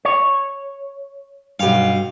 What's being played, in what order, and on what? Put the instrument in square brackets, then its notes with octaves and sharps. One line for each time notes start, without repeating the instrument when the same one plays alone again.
[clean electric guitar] C#5
[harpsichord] B1 F5 [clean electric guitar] G2